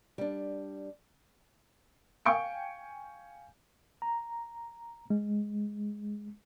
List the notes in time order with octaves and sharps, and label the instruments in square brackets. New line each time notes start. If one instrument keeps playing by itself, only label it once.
[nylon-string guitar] G3 D4
[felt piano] F5 G5 G#5 C#6 G6 D7
[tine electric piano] A#5
G#3